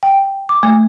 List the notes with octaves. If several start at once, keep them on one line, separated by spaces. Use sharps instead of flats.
G5
D6
A3